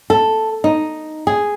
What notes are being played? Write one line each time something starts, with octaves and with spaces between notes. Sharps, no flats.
A4
D#4
G#4